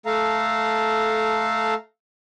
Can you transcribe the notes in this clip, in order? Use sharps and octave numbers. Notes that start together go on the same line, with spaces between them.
A3 A4 F5 A#5